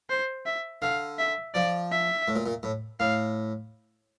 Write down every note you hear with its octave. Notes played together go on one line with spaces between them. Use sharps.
C5
E5
D3 F5
E5
F3 D5
E5
A2
A#2
A#2
A2
A2 F5